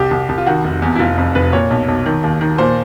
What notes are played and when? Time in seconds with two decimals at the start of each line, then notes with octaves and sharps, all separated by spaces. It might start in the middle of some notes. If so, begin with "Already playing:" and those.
Already playing: C2 G4
0.11 C2
0.29 C2
0.38 F4
0.46 D#3 F#4
0.64 F1
0.82 E2
0.96 E4
0.99 F1 F4
1.18 F2
1.35 F1 B4
1.53 A#2 C#5
1.70 B1
1.88 B1
2.06 D#3
2.23 D#2
2.41 D#3
2.58 A#2 C5